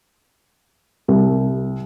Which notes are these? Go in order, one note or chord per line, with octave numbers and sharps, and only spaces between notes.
C2